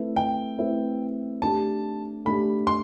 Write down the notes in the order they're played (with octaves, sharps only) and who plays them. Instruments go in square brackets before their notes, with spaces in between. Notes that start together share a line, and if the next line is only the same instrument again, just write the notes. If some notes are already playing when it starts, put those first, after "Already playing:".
Already playing: [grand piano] A3 C4 E4 B4 E5
[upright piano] G5
[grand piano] A3 C4 E4 B4 E5
[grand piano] A3 D4 G4 [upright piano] A5
[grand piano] A3 D4 G4 [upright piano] B5
[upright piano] C6